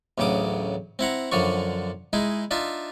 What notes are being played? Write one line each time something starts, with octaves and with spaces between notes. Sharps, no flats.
A1 D2 C#3 F#3 D6 D#6
C4 E4 F#5 A#5
F#2 D3 F3 D4 C#6
G#3 D#4 E4 G#4
D4 D#4 F4 E5